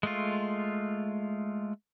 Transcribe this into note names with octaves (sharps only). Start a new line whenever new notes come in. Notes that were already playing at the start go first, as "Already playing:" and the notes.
G#3 A3 F4